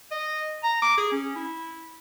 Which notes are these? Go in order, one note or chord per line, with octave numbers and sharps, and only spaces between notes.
D#5
A#5
D6
G#4
C#4
E4